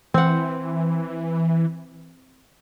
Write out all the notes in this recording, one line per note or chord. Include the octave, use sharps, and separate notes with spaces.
E3 C4 F#5